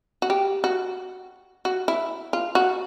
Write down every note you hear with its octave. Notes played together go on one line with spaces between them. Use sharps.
F#4
G4
F#4
F#4
E4
F4
F#4